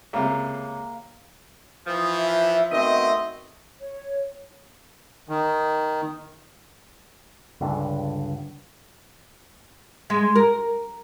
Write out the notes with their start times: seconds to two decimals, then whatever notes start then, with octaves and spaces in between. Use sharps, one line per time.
0.13 C#2 C3 A#3 F5
1.87 E3 F3 D#6
2.17 E5
2.72 B2 D#3 A3 C4 D#5
3.79 C#5
5.29 D#3
7.61 C#2 G2 D3
10.10 G#3
10.36 A#4